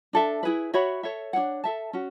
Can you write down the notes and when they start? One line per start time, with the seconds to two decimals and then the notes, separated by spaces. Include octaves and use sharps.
0.13 D4 A4 E5
0.43 E4 G#4 B4
0.74 F#4 C#5 E5 B5
1.03 A4 C#5 E5
1.33 D4 A4 C#5 F#5
1.64 A4 E5 A5
1.93 C#4 F#4